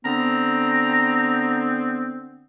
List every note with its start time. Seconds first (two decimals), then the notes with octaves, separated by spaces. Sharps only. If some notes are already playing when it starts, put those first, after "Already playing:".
0.05 D3 B3 C4 A#5